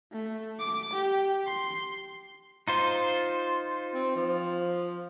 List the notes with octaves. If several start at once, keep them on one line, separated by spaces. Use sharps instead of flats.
A3
D6
G4
C6
D#4 F4 C5
C4
F3